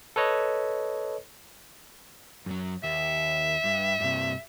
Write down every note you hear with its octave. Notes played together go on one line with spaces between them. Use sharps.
A4 B4 C#5 D#5
F#2 F#3
D#2 E5
G2
G2 C3